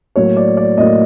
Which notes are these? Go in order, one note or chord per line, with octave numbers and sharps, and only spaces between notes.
A2 F#3 A#3 C#5
D5
D5
A2 F#3 A#3 D#5